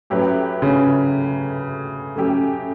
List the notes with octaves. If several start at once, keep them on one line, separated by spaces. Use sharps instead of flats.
A2 F#3 C#4 G4 B4
C#3
C#3 F#3 A3 C#4 G4